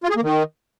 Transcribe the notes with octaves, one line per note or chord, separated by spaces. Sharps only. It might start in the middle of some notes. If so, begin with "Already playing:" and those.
F4
G#4
A#3
D#3